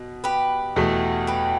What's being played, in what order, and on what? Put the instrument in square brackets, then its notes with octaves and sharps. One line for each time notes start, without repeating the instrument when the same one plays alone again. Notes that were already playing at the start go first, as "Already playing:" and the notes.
Already playing: [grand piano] B2
[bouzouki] G4 B4
[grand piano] E2 B2 A3
[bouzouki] G4 B4